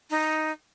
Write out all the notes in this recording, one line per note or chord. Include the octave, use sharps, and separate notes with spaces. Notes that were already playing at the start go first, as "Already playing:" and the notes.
D#4